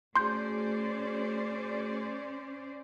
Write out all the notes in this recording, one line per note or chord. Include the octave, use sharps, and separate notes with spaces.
A3 C#4 F#4 G#4 C5 D5 C6 G6